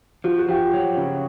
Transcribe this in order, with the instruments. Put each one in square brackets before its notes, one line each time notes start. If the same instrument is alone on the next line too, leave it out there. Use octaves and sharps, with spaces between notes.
[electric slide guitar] F3 [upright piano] F#4
[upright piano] F#4
[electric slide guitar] F3 [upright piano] G4
[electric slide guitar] F#3
C#3